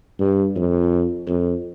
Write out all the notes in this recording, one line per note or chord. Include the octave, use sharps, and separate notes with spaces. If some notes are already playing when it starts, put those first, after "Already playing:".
G2
F2
F2